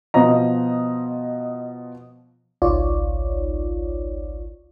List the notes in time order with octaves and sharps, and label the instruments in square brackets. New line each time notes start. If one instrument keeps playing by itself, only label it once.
[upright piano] B2 F3 C5 D#5 A#5
[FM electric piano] G#1 C#2 D#4 F4 C#5 D5